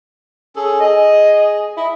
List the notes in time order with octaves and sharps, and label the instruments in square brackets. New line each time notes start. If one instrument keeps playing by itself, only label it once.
[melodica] C#4 G#4 A4
[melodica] G#4 [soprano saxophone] D#5
[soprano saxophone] E4 [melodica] D#5